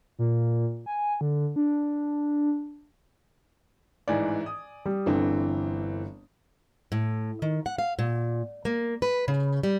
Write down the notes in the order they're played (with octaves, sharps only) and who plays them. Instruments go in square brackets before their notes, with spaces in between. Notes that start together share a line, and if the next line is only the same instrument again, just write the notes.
[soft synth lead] A#2
G#5
D3
D4
[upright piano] A1 G#2 E3 [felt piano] D5 G#5
[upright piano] D#6
[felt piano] G3
[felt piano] G1 D3 [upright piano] E3 C4
[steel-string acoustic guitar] A2
D#3
F#5
F5
A#2
A#3
B4
C#3
G3